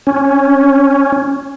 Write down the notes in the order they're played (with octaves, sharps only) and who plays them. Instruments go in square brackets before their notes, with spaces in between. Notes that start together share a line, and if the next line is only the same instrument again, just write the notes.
[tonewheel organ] C#4